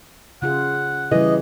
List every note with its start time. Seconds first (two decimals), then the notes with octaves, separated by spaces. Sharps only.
0.42 C#3 F4 G#4 F#5
1.11 C#3 E3 F#3 G3 D#5